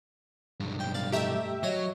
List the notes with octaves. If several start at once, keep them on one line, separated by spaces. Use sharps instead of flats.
B1 G2
G5
D5 F5
A3 D#4 G4 E5
F#3 C#5 D#5